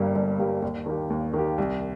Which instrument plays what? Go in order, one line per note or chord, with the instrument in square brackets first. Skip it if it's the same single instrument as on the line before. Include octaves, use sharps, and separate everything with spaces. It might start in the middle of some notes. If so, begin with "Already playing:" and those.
Already playing: [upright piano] G1 G2 G3 A#3 G4
G1
G2 G3 A#3 G4
D#2
D#3 A#3 G4
D#2
D#3 A#3 G4
C2